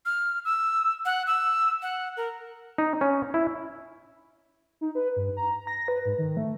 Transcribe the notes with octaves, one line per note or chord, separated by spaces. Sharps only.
F6
E6
F#5
E6
F#5
A#4
D#4
C#4
E4
D#4
B4
G2
A#5
A#6
B4
G#2
D#3
A3